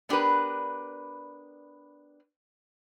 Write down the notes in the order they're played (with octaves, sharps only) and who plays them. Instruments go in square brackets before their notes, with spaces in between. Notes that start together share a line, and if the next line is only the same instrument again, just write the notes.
[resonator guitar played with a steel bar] B3 D4 G4 A#4 B4